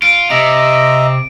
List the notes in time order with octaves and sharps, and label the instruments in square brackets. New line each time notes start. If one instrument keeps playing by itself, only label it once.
[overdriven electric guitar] F4 [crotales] D7
[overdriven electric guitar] C3 [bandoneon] D#5 E5 A#5 [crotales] D7